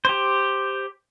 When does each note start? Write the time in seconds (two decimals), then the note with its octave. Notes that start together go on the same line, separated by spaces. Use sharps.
0.05 G4 C5